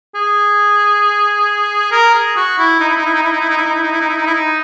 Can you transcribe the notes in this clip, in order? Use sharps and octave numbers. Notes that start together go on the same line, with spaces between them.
G#4
A#4
G#4
F#4
E4
D#4
E4
D#4
E4
D#4
E4
D#4
E4
D#4
E4
D#4
E4
D#4
E4
D#4
E4
D#4
E4
D#4